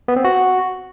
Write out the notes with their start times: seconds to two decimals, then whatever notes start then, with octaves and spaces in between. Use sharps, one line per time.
0.08 B3
0.16 C4
0.25 F#4